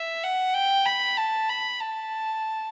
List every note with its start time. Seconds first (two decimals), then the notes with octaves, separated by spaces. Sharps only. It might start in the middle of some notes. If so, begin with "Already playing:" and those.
Already playing: E5
0.23 F#5
0.54 G5
0.85 B5
1.17 A5
1.49 B5
1.80 A5